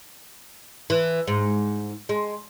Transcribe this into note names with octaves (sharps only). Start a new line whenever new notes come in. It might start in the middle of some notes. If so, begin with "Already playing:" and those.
E3
G#2
G#3